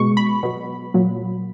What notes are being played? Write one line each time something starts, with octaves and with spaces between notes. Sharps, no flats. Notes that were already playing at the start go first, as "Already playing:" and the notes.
Already playing: B2 G#3 C#6
B5
B2 F#3
A#2 F#3